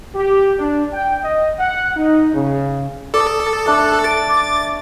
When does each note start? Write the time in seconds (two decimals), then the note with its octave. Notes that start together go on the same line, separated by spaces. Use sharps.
0.15 G4
0.58 D4
0.93 G5
1.24 D#5
1.59 F#5
1.97 D#4
2.34 C#3
3.14 A4 D5 D#6
3.67 A3 D4 F#6
4.04 A6 D7
4.28 D6